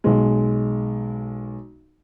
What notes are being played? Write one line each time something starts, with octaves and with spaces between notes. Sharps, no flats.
B1 G#3